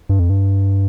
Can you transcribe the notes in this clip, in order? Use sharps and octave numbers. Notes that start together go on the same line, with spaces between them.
G2
F2
G2